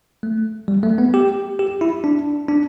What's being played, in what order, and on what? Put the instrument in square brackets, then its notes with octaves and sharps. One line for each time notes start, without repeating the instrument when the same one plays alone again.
[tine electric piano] A3
G3
A3
B3
G4
G4
E4
D4
D4